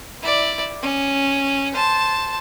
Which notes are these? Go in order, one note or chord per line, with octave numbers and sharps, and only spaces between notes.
E4 D5
C#4
C5 A5